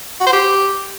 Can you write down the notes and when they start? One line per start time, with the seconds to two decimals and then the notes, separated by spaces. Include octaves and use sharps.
0.20 F#4
0.26 C5
0.33 G4